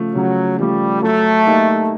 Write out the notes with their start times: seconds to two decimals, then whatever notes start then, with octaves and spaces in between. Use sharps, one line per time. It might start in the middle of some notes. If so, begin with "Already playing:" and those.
Already playing: C#3 F3 A3
0.15 C#3 F#3
0.59 F3 G3 A3
1.02 F#3 A3
1.46 A#3 D#4 G4